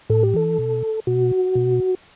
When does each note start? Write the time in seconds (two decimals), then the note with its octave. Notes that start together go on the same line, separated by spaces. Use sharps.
0.10 A2 A4
0.23 G4
0.34 E3 A4
0.58 B2
1.07 B2 F#4
1.55 B2